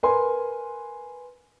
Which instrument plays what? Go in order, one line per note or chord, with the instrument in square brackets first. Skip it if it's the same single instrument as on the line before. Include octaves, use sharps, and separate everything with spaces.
[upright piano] A#4 B4 G#5 C6